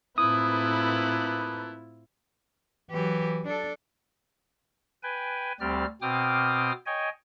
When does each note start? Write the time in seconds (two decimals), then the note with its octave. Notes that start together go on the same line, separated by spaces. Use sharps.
0.18 A2 A#3 C4 E4 F4 A4 B4 D#6
2.91 E3 F#3 G4
3.45 D4 A4
5.03 B4 G5 G#5
5.60 D2 G3 C4 G4 D5 F6
6.02 B2 C4 G5 D6 D#6 F6
6.86 C#5 D#5 G5 G#5